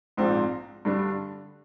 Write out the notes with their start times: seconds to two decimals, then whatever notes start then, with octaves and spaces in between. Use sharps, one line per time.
0.17 A#1 G#2 F3 C4
0.85 G2 D3 G3 D4